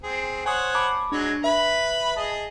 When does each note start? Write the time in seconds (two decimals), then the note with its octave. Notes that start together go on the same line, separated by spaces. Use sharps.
0.03 C4 G#4
0.46 C5 C#5 F#5 G#5 D#6
0.75 A5 B5 D6
1.12 F#3 G#3 D4 C#5
1.44 B4 E5 B5
2.16 G#4 D#5 A5